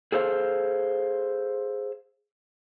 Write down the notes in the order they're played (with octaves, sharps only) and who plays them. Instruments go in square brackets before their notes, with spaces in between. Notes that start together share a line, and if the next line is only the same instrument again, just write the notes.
[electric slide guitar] G#4 A4 C5 F5